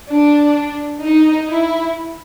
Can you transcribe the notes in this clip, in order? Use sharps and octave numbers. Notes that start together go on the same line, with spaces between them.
D4
D#4
E4